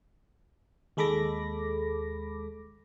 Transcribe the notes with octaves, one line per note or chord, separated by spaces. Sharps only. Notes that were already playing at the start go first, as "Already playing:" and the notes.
D#2 G#3 A4 B5 D6 A#6